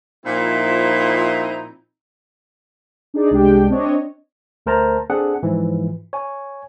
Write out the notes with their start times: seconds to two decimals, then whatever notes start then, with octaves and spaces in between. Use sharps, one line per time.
0.24 A#2 F3 C4 D#4 E4
3.14 D4 D#4 G#4 D5
3.31 C2 G#3 D4 G4 G5
3.70 C4 D4 C#5 D#5
4.66 D2 A3 A#4 C5 A5 A#5
5.10 C4 D4 G#4 A4 F#5
5.43 G#2 E3 F3
6.13 C#5 G#5